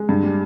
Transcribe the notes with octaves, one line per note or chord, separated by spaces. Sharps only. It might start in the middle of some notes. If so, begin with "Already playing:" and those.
Already playing: G#3
G2
G3